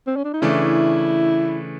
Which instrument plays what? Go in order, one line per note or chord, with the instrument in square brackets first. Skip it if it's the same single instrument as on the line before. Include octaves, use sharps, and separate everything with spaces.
[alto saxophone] C4
C#4
D4
D#4
[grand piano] C#3 E3 A3 D4 [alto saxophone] E4